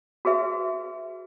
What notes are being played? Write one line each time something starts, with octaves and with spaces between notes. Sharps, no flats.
F#4 G#4 B4 E5